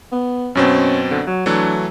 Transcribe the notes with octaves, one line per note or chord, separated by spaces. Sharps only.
B3
F#2 B2 C4 C#4
D3
F#3
E3 F#3 A3 D4